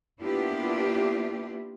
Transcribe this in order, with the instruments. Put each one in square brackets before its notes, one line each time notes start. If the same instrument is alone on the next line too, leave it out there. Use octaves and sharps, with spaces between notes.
[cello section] A#3 B3 D4 E4 F4 G4